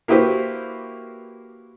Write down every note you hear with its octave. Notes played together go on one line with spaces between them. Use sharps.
A#3 E4 F#4 G4 B4 C5